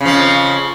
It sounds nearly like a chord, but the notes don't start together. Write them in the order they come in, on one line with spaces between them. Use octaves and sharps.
C#3 F3 F2